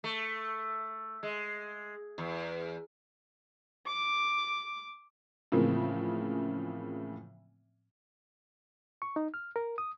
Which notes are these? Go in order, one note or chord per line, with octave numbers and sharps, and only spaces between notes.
A3
G#3
E2
D6
A2 C#3 E3 F3 A#3 C4
C#6
D#4
F6
A#4
D#6